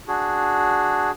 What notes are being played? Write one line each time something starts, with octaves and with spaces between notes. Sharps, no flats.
D4 F#4 G#4